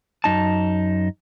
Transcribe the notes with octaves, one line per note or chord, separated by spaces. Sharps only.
F#2 D#4 A5